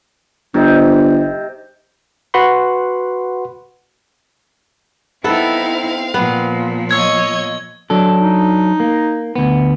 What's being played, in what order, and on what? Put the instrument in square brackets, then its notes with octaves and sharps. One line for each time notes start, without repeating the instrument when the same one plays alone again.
[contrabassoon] G1 [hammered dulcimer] C3 D#4
[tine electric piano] F#4 B4 F#5 B5 C6
[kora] B3 A4 [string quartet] C4 F5 [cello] D#4 E4
[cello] A#2 F3 [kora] B3
[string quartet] C#5 D#5 [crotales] E6 G#6
[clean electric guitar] F#3 D4 A4
[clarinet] D#4
[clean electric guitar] A#3
D2 B3